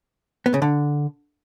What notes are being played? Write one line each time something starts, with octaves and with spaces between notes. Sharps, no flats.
B3
C#3
D3